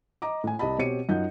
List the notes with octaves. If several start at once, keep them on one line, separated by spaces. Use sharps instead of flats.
D#5 A#5 D6
A2 G#5
C2 G3 D#5 A5 B5
B2 C4 G4 C#5 C#7 D#7
F#2 D#4 F4 F#5 G6